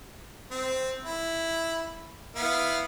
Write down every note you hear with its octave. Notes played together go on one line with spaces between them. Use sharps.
C4
E4
B3 E4 F5